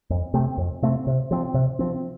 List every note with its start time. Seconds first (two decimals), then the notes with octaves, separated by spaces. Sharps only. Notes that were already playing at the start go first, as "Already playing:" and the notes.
0.10 F2
0.34 C3 A3 C4
0.58 F2
0.82 C3 A3 C4
1.07 C3
1.31 F3 C4
1.54 C3
1.79 F3 C4